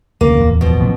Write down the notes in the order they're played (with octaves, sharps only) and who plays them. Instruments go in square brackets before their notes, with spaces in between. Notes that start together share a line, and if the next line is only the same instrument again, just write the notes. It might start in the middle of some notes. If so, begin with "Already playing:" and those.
[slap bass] F1 D2 C#3 [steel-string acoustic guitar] A#3
[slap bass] D1 E2
[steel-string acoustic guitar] B2 F3
[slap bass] A1 C3 F#3